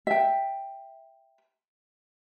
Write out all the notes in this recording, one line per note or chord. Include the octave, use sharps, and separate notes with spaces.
E5 G5